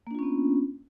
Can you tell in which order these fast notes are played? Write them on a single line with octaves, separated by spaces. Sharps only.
A#3 D4 F4 C#4 B3